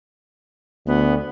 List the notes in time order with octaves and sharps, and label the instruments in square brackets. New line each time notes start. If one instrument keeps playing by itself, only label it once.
[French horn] D2 [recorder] B3